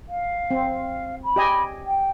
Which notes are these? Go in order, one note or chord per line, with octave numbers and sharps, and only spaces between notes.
F5
C4
B5
G4 D#5 G#5
G5